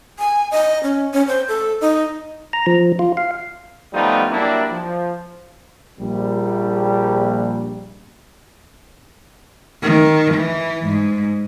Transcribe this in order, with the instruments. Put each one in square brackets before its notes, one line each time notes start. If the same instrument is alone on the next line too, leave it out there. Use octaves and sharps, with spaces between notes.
[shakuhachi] G#5
D#5
C#4
C#4
C5
A4
D#4
[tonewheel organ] A#5
F3
F4
F5
[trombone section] F3 G3 A3 B3 D#4 F4
F#3 G3 A#3 D4 E4
F3
A#1 G3
[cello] D#3
E3
G#2